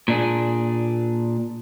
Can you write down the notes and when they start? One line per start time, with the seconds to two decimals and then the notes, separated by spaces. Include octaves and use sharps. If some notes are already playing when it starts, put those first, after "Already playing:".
0.08 A#2 D4 G#4